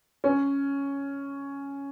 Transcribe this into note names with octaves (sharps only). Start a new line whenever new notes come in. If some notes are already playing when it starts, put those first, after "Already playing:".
C#4